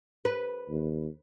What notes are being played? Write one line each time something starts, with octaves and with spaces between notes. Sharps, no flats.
B4
D#2